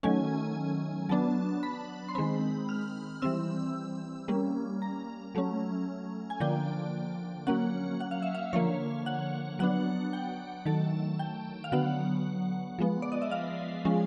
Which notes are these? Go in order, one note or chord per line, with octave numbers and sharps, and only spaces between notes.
D#3 F#3 A3 C#4 G#5
F#3 B3 D4 A5
B5
C6
D#3 G#3 C4 B5
F6
E3 G3 C4 E6
G3 A#3 C#4
A#5
F#3 A3 C#4
G#5
D3 F3 A#3 D4 G5
F#3 A#3 C#4 F#5
F#5
F5
E5
F5
D3 F3 A#3 C#5
F#5
F#3 B3 D4 F#5
G5
D#3 F#3 A3 A5
G5
F5
D3 F#3 B3 F#5
F3 G#3 B3
D5
D#5
E5
F5
F3 G#3 C#4